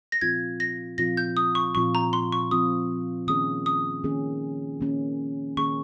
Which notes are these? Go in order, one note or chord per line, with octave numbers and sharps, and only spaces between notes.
A#6
A#2 F3 C4 F4 G#6
A#6
A#2 F3 C4 F4 A#6
G6
D#6
C#6
A#2 F3 C4 F4 C#6
A#5
C6
C#6
A#2 F3 C4 F4 D#6
D#3 A#3 C#4 G#4 D#6
D#6
D#3 A#3 C#4 G#4
D#3 A#3 C#4 G#4
D#3 A#3 C#4 G#4 C#6